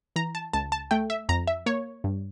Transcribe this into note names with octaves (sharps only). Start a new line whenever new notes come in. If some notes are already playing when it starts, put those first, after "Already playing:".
E3 A#5
A5
C#2 A5
A5
A3 G5
E5
F2 A#5
E5
A#3 C#5
G2